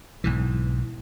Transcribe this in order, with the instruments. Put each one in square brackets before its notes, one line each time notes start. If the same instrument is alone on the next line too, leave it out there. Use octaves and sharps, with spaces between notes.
[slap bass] B1 G#2 E3